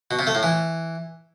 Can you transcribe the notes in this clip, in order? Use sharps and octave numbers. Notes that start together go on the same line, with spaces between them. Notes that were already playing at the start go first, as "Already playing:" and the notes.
B2
C3
A3
A2
E3